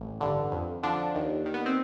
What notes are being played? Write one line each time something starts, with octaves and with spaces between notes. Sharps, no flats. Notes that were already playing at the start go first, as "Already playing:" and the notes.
Already playing: A1
G2 D3
F2
D3 F3 D4
D#2
D#3
B3
C4